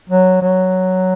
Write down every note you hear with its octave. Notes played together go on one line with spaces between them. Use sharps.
F#3
F#3